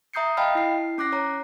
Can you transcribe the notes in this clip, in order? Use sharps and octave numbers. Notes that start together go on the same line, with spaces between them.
E5 A#5 D#6 G6 C7 C#7
D#5 F5 G5 A5 B5 F6
E4 C7
C#4 D6 F#6 A#6 C7
C#5 A#5